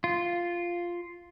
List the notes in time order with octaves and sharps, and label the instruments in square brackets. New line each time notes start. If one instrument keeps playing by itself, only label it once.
[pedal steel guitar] F4